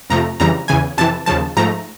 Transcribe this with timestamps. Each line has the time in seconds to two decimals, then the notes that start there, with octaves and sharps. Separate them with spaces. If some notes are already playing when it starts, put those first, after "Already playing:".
0.10 F2 C3 F3 A3 A#5
0.40 F2 C#3 E3 G3 A#5
0.68 E2 C#3 E3 G#5
0.97 F2 C3 E3 A5
1.26 D#2 C#3 F3 A5
1.57 G#2 F3 A3 A#5